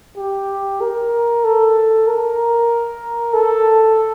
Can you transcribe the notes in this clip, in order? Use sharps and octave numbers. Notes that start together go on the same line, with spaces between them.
G4
A#4
A4
A#4
A4